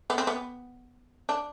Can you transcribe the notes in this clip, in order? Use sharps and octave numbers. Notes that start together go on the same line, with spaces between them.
B3
C4
B3
D4